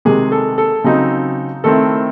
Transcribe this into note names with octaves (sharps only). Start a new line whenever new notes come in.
C3 D#3 G#3 G#4
A4
A4
C#3 F#3 C4 D#4
D#3 A3 C4 E4 A4